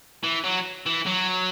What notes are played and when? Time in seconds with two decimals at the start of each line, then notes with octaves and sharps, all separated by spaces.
0.24 E3
0.44 F#3
0.86 E3
1.06 F#3